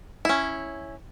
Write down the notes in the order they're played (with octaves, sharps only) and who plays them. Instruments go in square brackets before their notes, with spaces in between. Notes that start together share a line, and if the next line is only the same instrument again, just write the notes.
[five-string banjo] C#4 E4